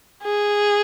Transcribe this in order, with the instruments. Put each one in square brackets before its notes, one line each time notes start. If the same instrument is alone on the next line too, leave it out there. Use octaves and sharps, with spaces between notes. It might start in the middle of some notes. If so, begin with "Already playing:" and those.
[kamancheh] G#4